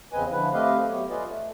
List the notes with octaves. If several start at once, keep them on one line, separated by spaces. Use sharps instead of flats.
E2 C#3 C4 B4 D#5 G#5
D3 F3 E4 B4
A3 C4 G4 B4 D#5 F5
F#3 A3 B3 G4 C#5
F4 G#4 B4 D5 D#5
A3